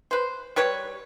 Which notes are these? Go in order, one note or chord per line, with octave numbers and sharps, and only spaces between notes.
B4 C5
G3 B4 C#5